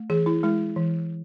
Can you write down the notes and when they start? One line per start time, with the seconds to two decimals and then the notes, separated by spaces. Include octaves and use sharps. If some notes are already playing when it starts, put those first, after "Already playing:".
Already playing: A3
0.10 E3 G#4
0.26 E4
0.43 G#3 E4
0.76 E3